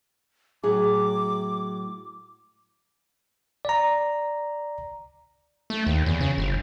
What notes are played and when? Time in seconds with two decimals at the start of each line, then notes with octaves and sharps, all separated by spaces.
0.64 A2 F#3 G#4 D6
3.65 D5 A#5
5.70 A3
5.86 D#2
6.06 E2
6.21 C#3
6.38 G1